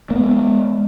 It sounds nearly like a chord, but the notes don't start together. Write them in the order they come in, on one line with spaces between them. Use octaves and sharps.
A#3 B3 G#3